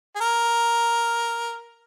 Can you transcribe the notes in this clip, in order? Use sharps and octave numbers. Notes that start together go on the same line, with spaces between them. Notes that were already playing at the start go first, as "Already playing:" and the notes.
G#4
A#4